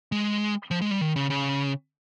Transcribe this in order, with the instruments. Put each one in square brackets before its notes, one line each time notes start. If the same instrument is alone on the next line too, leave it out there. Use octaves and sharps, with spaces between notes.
[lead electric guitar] G#3
F3
G#3
G3
D#3
C#3
C#3